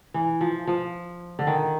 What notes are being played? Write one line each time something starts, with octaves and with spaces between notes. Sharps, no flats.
E3
F3
F3
D3
D#3